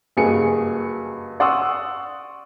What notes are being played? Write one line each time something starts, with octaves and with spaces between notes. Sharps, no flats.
F#1 G2 F#4 G#4 G#5 C#7
D5 F#5 C6 C#6 D#6 E6